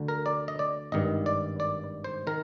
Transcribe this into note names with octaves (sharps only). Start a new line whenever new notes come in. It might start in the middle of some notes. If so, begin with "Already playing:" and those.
Already playing: D2 D3
A#4
D5
D#5
D5
G#1 G2 D#3 D#5
D5
D5
C5
D#3 A#4